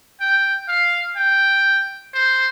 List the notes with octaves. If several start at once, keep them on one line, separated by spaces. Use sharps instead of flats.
G5
F5
G5
C5